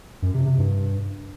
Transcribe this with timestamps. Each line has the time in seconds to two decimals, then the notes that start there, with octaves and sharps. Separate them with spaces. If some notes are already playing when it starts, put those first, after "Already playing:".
0.22 F#2
0.34 C3
0.46 C3
0.58 G2